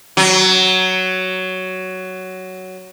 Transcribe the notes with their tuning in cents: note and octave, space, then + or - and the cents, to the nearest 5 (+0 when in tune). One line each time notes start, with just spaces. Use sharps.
F#3 +10